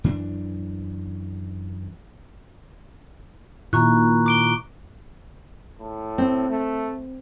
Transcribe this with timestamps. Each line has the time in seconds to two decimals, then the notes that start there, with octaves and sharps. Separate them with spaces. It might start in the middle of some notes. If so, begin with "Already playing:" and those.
0.04 F#2 E3 D4
3.73 A#2 D#3 E4 A#5 C#6 F#6
4.26 D6 D7 G7
5.79 A2
6.18 C4
6.49 A3